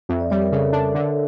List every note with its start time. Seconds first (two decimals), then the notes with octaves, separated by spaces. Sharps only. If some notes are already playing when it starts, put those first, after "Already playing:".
0.09 F2 E5
0.20 D5
0.30 G3 C#5
0.42 A#4
0.52 C#3 A4
0.73 D4
0.95 D3